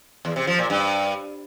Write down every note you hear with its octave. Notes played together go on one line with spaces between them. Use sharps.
E2
C3
F3
A#2
G2